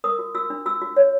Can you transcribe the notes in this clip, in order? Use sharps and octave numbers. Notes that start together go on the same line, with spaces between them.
A#4 D#6
F#4
F#4 E6
D4
F#4 E6
F#4
C#5